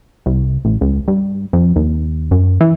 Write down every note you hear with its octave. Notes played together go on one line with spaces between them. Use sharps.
C2
A1
C#2
G2
F2
D#2
F#2
E3